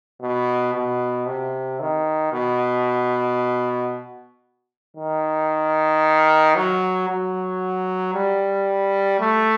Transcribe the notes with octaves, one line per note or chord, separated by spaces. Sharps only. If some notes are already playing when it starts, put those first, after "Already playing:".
B2
B2
C3
D#3
B2
D#3
F#3
F#3
G3
A3